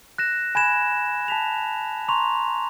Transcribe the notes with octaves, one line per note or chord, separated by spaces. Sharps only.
F#6 A#6 E7
G#5 B5 G#6 E7
A5 B6 F7
A#5 C6 C#6 F7